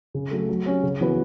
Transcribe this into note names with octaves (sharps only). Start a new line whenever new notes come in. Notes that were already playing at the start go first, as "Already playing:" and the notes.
C#3
F#3 A3
F#3
C#4 G4 C#5
C#3
E3 B3 F#4 B4